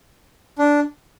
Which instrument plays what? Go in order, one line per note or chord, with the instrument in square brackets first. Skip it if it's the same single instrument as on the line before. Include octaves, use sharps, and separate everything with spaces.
[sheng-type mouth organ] D4